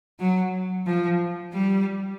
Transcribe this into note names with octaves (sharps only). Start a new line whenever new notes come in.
F#3
F3
G3